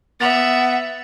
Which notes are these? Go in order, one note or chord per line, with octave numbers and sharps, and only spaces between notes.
B3 E5 F#5 A6 F7 F#7